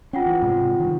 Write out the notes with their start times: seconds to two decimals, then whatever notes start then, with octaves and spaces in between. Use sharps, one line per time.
0.13 C#4 F4 F#5 G5
0.26 E3
0.42 G#2 C3 G#3
0.80 D#3 G3